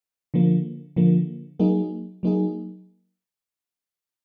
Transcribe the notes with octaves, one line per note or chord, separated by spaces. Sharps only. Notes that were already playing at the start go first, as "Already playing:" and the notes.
D3 F3 A#3
D3 F3 A#3
F#3 A#3 D#4 G#4
F#3 A#3 D#4 G#4